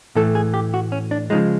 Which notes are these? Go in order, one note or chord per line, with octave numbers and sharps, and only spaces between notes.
A2 E3 A3 A4
G#4
G4
F#4
C#4
D4
C#3 F3 G#3 D#4